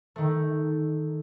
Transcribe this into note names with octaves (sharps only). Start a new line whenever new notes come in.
D#3 A3